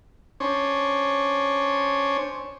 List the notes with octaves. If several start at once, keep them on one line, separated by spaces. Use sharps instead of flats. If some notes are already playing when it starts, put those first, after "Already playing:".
C#4 D4 C5 C#5